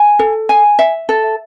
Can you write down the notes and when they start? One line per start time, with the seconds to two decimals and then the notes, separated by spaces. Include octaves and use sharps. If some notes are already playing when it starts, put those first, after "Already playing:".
Already playing: G#5
0.19 A4
0.49 G#5
0.79 E5
1.09 A4